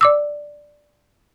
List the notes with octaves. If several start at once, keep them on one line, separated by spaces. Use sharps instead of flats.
D5 D6 E6